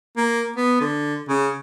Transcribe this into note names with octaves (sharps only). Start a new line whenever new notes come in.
A#3
B3
D3
C#3